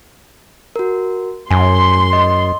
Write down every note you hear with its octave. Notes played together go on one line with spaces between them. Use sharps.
F#4 A#4
F#2 G#5 C6
D#5